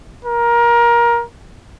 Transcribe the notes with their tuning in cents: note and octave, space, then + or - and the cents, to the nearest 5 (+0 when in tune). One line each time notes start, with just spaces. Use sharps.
A#4 +20